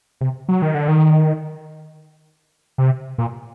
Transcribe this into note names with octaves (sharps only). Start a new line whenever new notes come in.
C3
F#3
D#3
D3
D#3
C3
A#2